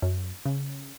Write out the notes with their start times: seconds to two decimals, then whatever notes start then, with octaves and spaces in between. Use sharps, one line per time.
0.02 F#2
0.46 C#3